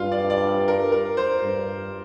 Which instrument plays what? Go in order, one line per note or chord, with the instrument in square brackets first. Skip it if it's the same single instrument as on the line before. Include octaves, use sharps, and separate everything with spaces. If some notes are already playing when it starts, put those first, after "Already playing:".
Already playing: [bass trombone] G2 [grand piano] F4
[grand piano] D5
D5
A#4
A#4
C5
[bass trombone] G2